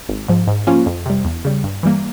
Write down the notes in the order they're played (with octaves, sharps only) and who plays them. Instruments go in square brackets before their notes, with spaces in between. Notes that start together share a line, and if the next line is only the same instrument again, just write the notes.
[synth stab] G#1
G#2 F3
G#2
F3 A#3 C#4 F4
F2
C3 G3
E2
C#3 G3
G2
E3 G3 A#3